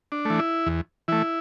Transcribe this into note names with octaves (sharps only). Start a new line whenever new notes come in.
D4
E3 A3
E4
E2
E3 A3 E4